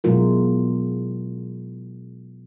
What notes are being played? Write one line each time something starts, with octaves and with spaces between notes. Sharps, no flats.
B2 F#3 G#3 E4 F4 A#4